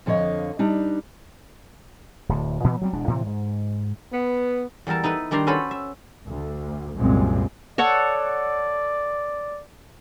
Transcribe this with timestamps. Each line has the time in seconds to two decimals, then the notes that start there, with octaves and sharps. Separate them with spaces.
0.06 F2 D3 F3 C#5 D#5 F5
0.59 G3 D4 D#4
2.29 D1 D2
2.64 A#2 E3 B3
2.81 F#3 G3 C4
2.93 E1 B2 G#3 D4
3.07 A2 C3 E3 F3
3.26 G#2
4.13 B3
4.87 E2 G3 A4 A#4 A5
5.04 D#4 E4 A4 B4
5.31 D#3 G3 D4 D5 A#5 C6
5.47 C#4 F#4 A4 B4 C5 B5
5.71 E5
6.27 D2
6.98 C2 F#2 A#2 G#3 C4
7.78 A4 C#5 D5 F#5